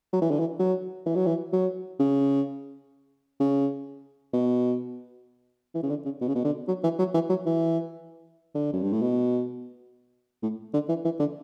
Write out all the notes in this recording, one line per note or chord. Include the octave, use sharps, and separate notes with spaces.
F#3
E3
D3
E3
F#3
E3
F#3
E3
F#3
C#3
C#3
B2
E3
C#3
D3
C#3
B2
C#3
B2
D3
F#3
E3
F#3
E3
F#3
E3
D3
F#2
G2
A2
B2
A2
D3
E3
E3
D3